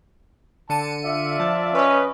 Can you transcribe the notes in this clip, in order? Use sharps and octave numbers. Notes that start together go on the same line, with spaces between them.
D3 A5 C#7 D#7
F4 D5 E5
F3 A5
C#4 B4 D#5